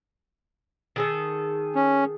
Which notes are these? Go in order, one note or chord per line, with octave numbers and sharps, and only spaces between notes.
D#3 G#4 A4
C#4